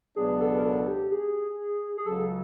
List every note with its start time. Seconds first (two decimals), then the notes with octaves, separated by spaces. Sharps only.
0.16 C#2 B2 F#3 B3 D4 G#4
0.41 A4
0.59 A#4
0.64 A4
0.88 G4
1.11 G#4
1.97 G#4
2.06 C#2 C#3 F#3 A4